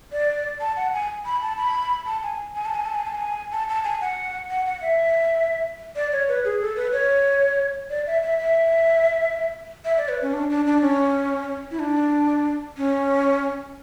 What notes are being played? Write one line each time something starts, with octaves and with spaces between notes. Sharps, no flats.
D5
A5
F#5
G#5
B5
A5
B5
A5
G#5
G#5
A5
G#5
A5
G#5
A5
G#5
A5
A5
G#5
F#5
F#5
F#5
E5
D5
C#5
B4
G#4
A4
B4
C#5
D5
E5
E5
E5
E5
D5
B4
C#4
D4
D4
D4
C#4
E4
D4
C#4